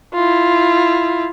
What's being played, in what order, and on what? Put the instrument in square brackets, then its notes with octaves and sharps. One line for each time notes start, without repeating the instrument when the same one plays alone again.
[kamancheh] E4 F4